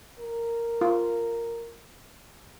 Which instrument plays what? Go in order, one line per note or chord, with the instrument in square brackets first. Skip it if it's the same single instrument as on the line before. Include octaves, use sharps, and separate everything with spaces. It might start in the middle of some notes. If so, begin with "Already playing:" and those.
[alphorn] A#4
[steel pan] F4